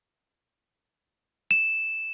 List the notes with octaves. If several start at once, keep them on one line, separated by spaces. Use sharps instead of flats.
E7